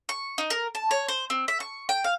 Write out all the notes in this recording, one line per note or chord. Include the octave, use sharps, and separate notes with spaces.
C#6
D#4
A#4
A5
C#5
C5
C4
E5
C#6
G5
F5